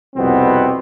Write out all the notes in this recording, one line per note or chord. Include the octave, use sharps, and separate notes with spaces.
C2 F2 B2 B3 C4